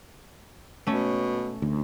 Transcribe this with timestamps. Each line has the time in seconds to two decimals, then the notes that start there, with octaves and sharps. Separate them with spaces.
0.87 B2 A3 C#4
1.62 D2